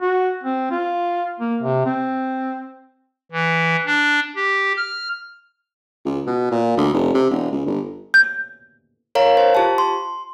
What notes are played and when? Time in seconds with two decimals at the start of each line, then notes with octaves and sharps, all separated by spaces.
0.01 F#4
0.43 C4
0.71 F4
1.40 A#3
1.62 C3
1.86 C4
3.32 E3
3.86 D4
4.36 G4
4.77 F6
6.05 C#2
6.27 B2
6.51 A#2
6.77 D2
6.94 F1
7.14 C3
7.30 E1
7.52 C#2
7.66 G1
8.14 G6
9.15 A#4 C#5 F5 A#5
9.37 C5
9.55 F4 G4 A5
9.78 C6